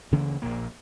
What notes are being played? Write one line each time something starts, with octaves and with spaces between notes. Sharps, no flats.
D2 C#3 E3 A#3
A#1 A#2 A#3